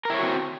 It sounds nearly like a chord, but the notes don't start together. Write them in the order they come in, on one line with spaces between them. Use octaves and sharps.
A#4 E4 C#5 F#4 C4